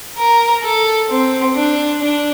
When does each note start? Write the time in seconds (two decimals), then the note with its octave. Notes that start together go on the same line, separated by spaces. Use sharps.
0.18 A#4
0.64 A4
1.10 C4
1.56 D4
2.01 D4